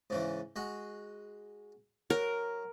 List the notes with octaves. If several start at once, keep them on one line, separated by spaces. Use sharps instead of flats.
G#2 C#3 E3
G#3 F#4
F#3 A#4